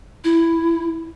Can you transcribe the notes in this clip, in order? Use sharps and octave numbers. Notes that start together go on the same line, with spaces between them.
E4